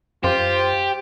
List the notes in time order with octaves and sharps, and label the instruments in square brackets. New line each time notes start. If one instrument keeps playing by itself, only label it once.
[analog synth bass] F#2 [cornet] F4 [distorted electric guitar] G4 [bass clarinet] C5